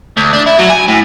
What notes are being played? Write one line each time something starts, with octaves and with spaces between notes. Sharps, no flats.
D2
D4
E4
F#3
G#5
A2